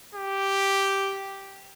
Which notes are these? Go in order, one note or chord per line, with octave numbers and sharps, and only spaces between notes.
G4